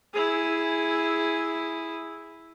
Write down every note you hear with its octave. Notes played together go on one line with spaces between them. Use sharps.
E4 G#4